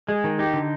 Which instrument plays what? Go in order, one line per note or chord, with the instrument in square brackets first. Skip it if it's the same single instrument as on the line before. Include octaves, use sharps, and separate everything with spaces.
[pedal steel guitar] G#3 [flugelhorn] G#4
[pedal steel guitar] D#3
[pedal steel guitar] D#4 [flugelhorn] G4
[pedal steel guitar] D3